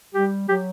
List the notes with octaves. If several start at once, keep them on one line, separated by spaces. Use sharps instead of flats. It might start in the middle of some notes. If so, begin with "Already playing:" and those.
G3 G4
F#3 G4